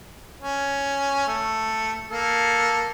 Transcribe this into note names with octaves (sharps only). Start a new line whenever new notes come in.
C#4
A3
A#3 A4